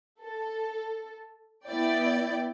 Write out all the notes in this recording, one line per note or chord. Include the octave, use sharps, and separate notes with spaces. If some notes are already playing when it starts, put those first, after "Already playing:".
A4
B3 E4 D5 G5